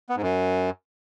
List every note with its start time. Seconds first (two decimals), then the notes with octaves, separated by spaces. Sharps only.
0.09 B3
0.16 G#2
0.22 F#2